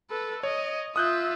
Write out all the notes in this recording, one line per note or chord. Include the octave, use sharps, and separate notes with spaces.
A4 B4
C#5 D#5
F4 E5 D#6 F#6 G6